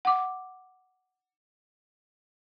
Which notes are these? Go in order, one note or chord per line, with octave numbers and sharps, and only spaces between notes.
F#5 D6